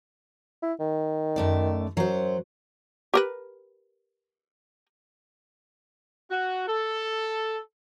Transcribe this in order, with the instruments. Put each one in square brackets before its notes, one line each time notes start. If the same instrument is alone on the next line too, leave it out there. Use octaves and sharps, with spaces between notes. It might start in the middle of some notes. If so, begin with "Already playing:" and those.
[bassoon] E4
D#3
[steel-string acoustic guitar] F#2 A3 D5
[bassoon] F#2 [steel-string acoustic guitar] F#3 C5
[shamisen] G4 A#4 B4
[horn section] F#4
A4